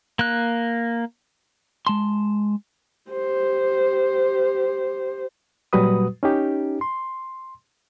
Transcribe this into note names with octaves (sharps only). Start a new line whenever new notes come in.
A#3 F#6
G#3 A5 C6
G4 C5
A#2 F#3 G3 F#4 B4 D#6
C#4 D#4 G4
C6